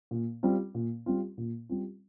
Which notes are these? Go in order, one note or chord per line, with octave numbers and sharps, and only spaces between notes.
A#2
G3 C4 F4
A#2
G3 C4 F4
A#2
G3 C4 F4